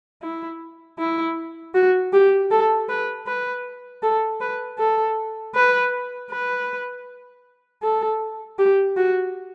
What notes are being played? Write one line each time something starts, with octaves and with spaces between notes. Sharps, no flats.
E4
E4
F#4
G4
A4
B4
B4
A4
B4
A4
B4
B4
A4
G4
F#4